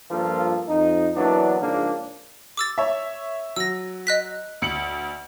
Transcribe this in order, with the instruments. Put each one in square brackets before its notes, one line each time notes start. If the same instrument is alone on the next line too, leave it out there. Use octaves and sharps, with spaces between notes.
[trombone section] G2 F3 A#3 F4 A4 A#4
F2 D#4
E3 F#3 A#3 B3 D4
G#2 C#3 F3 A#3 D4
[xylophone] D6 E6 A6
[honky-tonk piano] C#5 E5
[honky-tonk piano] F#3 [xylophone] E6 A#6
[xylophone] D#5 F#6 B6
[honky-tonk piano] D2 C#7 F#7